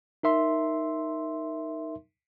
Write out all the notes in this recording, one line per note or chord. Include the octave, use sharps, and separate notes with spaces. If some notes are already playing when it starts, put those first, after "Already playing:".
D#4 A#4 E5 C6